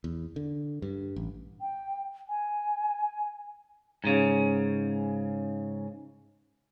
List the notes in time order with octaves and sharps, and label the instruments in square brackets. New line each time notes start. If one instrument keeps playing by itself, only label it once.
[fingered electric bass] E2
D3
G2
A1
[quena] G5
G#5
[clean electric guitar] G#2 C#3